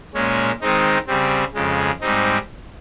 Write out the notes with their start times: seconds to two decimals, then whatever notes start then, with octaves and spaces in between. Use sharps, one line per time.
0.14 A#2 G#3 C#4
0.61 D#3 G#3 C4 D#4
1.07 C#3 G3 C4
1.54 F2 C#3 G#3
2.01 G#2 G3 C4 D#4